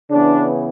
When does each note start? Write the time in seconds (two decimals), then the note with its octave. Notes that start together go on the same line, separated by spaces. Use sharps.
0.11 C#3 E3 B3 D4